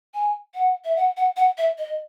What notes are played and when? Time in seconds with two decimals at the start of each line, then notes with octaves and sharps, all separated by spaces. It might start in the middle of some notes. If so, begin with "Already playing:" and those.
0.14 G#5
0.55 F#5
0.85 E5
0.96 F#5
1.17 F#5
1.36 F#5
1.58 E5
1.78 D#5